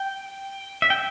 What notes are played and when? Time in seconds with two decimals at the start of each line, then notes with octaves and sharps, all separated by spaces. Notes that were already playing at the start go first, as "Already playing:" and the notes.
Already playing: G5
0.82 E5
0.90 G5